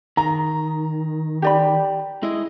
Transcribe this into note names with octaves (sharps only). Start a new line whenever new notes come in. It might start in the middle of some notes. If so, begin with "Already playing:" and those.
D#3 A#5
G4 D5 B5
G#3 E4 D#5